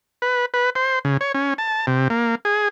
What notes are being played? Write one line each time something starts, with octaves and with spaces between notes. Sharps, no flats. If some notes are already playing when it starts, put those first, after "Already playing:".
B4
B4
C5
C#3
C#5
C#4
A5
C3
A#3
G#4